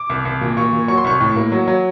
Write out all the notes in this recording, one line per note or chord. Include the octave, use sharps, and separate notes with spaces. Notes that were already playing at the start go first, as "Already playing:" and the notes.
Already playing: D6
C2
C2
A#2
A#2 C#6
A#2
F#3 C#6
C6
C2 C#6
A2
A#3
F#3
F#3